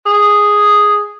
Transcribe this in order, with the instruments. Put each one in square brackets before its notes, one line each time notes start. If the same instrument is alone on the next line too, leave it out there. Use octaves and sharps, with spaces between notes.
[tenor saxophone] G#4